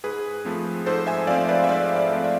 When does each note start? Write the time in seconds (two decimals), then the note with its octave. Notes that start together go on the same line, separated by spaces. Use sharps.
0.04 G#2 G#4 B4
0.45 F3 A3 C4
0.86 G#2 A4 C5
1.07 E5 G#5
1.27 F3 A3 C4 D5 F5
1.49 B4 D5
1.64 E5
1.69 G#2 D5 F5
1.96 D5 F5
2.10 F3 A3 C4
2.24 E5